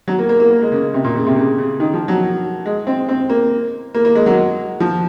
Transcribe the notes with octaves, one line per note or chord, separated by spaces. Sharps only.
F#3
A#3
A#3
A#3
A#3
G#3
C#3
C3
A#2
C#3
C3
C#3
C#3
D#3
F3
F#3
G#3
C4
C4
A#3
A#3
A#3
G#3
F#3
F3